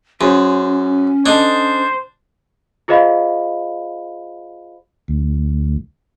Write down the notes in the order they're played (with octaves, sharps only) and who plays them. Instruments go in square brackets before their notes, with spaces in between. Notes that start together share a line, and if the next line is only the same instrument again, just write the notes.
[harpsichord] F#2 [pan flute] C#4 [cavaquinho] G#4 C5
[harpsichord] D4 [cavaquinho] A4 D#5 D#6 [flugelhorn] C5
[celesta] F4 G#4 C5 D#5 F5 B5
[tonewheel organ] D2